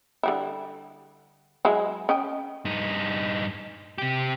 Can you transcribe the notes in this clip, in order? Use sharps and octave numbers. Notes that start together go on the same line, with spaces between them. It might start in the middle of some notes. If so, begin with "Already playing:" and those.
D3 G3 E4
F#3 G#3 E4
C#4 D#5 G5
G2 D#4
C3 G4